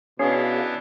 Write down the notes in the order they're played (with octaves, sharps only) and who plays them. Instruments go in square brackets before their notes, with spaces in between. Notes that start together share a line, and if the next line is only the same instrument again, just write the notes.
[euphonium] B2 [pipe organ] E3 B3 D4 [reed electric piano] C#4 [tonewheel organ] G#4 C#5 F5